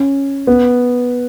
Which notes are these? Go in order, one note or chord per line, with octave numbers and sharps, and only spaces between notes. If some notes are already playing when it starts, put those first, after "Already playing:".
Already playing: C#4
B3